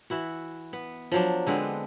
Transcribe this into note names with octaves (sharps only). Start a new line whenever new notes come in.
E3 E4 F#4
B3
F3 F#3 D4
D3 G#3 B3 C4